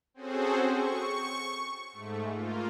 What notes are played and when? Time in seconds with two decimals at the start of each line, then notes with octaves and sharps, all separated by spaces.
0.14 C4 C#4 F#4 G#4 A4 C5
0.67 C#6
1.92 G#2 A3
2.31 A#3 F4